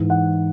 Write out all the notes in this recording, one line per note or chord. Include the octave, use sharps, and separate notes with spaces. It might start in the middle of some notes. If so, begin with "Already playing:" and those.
Already playing: G#2 E3
F#5